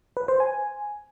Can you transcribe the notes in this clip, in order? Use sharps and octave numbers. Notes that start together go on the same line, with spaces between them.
B4
C5
G#5